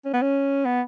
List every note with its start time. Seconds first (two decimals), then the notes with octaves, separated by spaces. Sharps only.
0.05 C#4
0.14 B3
0.22 C#4
0.65 B3